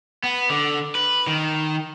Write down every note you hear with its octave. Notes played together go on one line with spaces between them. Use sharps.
B3
D3
B4
D#3